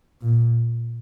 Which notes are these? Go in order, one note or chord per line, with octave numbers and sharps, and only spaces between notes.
A#2